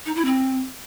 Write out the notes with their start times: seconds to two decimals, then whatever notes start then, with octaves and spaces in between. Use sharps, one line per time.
0.06 D#4
0.15 E4
0.25 C4